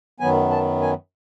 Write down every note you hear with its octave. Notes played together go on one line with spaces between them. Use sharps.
F#2 D#3 F#3 B3 G#5
A5
G#5